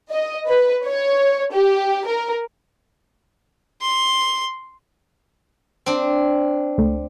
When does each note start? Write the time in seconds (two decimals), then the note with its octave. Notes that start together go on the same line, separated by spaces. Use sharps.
0.11 D#5
0.49 B4
0.85 C#5
1.53 G4
2.06 A#4
3.81 C6
5.86 C4 D4
6.78 C#2 A3